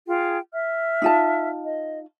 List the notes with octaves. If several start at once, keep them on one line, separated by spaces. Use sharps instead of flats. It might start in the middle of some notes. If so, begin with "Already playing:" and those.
F4 G#4 G5
E5 F6
D#4 F4 A5
D#5